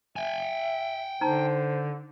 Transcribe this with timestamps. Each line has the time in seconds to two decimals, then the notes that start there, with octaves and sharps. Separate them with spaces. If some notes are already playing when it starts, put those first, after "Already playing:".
0.16 E5 G5 G#5
1.21 D3 D#4 C5 A#5